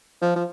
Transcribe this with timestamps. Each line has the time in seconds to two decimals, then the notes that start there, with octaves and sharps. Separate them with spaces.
0.22 F3
0.36 F3